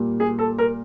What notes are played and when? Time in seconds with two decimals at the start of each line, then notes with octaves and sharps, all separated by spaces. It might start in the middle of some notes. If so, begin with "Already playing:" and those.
Already playing: A#2 G3 A#3
0.20 G#4
0.39 A4
0.58 A#4